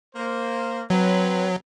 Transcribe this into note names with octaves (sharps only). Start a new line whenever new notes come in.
A#3 C5
F#3 C4 B4